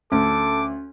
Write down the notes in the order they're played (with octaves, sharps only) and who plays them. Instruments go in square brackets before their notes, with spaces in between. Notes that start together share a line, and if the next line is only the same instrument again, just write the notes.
[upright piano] D2 [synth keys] C#4 [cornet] A4 [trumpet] D6